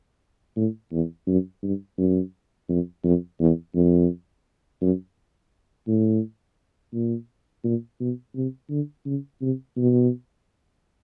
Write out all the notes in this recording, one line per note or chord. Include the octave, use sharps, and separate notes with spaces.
A2
E2
F#2
G2
F#2
F2
F2
E2
F2
F#2
A2
A#2
A#2
B2
C3
D3
C#3
C3
B2